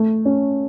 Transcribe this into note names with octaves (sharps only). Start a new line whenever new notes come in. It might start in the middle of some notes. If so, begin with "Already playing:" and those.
Already playing: A3
C#4